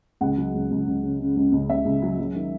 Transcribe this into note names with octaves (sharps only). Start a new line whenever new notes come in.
C#2 F#5
F#3
C#2
C#2
C#2
C#3
C#3
C#2
C#2
C#2 E5
C#2
F#3
F#3
D#3